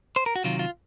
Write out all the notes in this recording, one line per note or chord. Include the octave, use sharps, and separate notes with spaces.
C5
A#4
F#4
C3 D#3 F#3 F4
F4